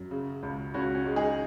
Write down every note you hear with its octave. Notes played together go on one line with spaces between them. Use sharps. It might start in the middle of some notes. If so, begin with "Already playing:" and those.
Already playing: F#2
C#3
C#2
C#2 C#4 F#4
C#4
G#3
D#4 G#4